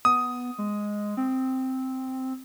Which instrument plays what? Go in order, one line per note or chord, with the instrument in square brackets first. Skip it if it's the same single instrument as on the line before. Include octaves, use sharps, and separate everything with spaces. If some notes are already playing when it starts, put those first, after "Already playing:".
[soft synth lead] B3 [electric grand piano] D#6
[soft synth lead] G#3
C4